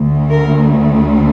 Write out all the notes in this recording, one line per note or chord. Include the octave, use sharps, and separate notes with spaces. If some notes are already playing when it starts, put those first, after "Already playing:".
Already playing: D2 D3 A3
A#4